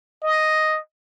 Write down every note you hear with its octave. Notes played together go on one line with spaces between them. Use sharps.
D#5